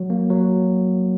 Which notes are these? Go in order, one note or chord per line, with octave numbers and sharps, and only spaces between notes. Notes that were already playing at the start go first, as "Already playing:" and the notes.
Already playing: F#3
A#3
F#3